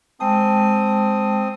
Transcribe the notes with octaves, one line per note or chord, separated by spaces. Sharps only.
G#3 C4 G5 A5 D#6